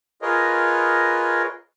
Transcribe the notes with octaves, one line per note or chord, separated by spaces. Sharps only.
F4 G#4 A#4 B4 C#5 D#5